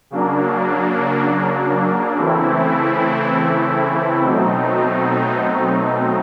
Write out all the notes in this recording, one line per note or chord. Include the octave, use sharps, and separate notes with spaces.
C#3 F#3 A#3 D4
C#3 E3 A3 C4 E4
B2 F#3 A3 C4 D#4